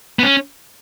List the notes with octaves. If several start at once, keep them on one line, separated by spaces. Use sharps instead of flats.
B3
C#4